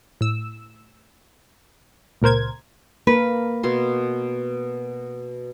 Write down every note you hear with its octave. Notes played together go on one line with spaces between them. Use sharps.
A2 E6
C#2 A#2 A#4 C5 G#6
A#3 A#4 B4
B2 C#5 C6